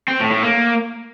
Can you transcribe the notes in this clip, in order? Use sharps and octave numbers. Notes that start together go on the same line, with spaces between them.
C4
A2
A2
A#3